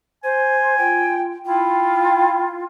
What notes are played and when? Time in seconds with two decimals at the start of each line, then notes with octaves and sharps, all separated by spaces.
0.24 C5 G#5
0.78 F4 G5
1.45 E4 F4 G5